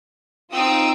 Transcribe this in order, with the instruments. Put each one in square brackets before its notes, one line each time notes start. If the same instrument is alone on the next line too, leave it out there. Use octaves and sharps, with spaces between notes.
[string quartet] C4 D#4 [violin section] F4 D#6 E6